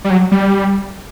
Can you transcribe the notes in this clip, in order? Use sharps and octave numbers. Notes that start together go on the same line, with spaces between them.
G3
F#3
G3